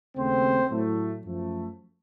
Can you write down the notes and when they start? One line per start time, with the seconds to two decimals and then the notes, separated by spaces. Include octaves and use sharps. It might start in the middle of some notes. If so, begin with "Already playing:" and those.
0.16 D#2 C#3 A3 C4 C5
0.70 A2 F#3 A3
1.24 F#2 F3 A3